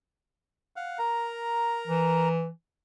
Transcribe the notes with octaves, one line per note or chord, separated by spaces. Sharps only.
F5 F#5
A#4 A#5
E3